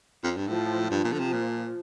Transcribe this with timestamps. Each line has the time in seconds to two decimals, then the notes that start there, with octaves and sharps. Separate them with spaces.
0.24 F2
0.37 G2
0.48 A2 F3
0.91 G2 F3
1.05 A#2
1.13 D3
1.19 C3
1.33 A#2